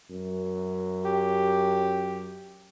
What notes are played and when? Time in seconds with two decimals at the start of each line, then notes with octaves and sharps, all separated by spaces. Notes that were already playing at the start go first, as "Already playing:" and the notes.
0.11 F#2
1.05 G4